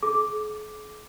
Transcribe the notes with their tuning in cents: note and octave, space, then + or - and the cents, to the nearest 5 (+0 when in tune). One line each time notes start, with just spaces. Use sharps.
G#4 +45 D6 +0